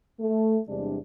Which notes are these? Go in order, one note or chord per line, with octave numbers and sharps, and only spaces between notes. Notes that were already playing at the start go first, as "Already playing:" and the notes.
A3
E2 C3 G3 G#3 D4